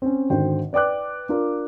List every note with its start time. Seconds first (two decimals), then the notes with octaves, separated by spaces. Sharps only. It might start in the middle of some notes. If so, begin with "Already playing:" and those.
0.02 C4 C#4
0.30 G#1 D3 F#4 C5 G5
0.73 B4 D5 G5 D6 F#6
1.29 D4 F4 A#4